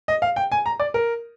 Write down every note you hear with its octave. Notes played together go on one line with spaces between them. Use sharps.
D#5
F5
G5
G#5
A#5
D5
A#4